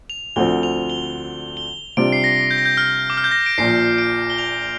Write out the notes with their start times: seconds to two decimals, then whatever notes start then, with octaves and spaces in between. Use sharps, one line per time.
0.10 F7
0.36 D2 D3 F3 C4 G7
0.63 F7
0.90 G7
1.57 G7
1.97 C3 G3 D4 F4 C5 D7
2.12 C7
2.24 A#6
2.51 G6
2.58 A#6
2.65 G6
2.77 F6
3.10 D6
3.17 F6
3.24 G6
3.31 A#6
3.46 D7
3.58 A#1 A#2 F3 C7
3.98 D7
4.30 G7
4.38 F7